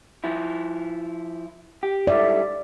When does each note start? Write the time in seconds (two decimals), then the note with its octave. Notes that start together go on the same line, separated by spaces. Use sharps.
0.24 F3 E4
1.83 G4
2.07 G#2 G3 E4 A4 D5 E5